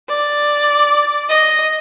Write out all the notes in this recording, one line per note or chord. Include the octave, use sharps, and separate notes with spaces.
D5
D#5